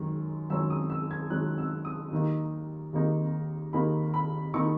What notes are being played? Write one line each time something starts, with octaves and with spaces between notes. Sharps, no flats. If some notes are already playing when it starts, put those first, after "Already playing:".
Already playing: F#2 D#3 G#3
F#2 D#3 G#3 C#4 E6
D#6
E6
G#6
F#2 D#3 G#3 C#4 F#6
E6
D#6
D#2 D#3 A#3 D#4
D#2 D#3 A#3 D#4
D#2 D#3 A#3 D#4 B5
B5
D#3 A#3 D#4 C#6